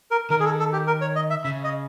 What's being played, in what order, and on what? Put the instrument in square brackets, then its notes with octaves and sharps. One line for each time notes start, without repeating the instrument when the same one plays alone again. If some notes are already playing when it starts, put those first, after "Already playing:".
[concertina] A#4
[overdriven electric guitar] D#3 [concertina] A#4
[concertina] G#4
A4
A4
G4
A#4
C#5
D#5
E5
[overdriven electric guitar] C#3 [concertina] E5
[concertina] D#5